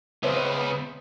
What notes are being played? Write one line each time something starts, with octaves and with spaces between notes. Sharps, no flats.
C#2 C#3 B3 C5 E5